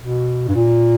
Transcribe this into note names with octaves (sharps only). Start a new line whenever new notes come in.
B2
G2
A#2